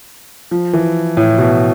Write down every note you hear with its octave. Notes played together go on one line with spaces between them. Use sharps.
F3
E3
A2
B2